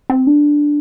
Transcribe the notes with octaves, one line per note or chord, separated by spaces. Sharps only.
C4
D4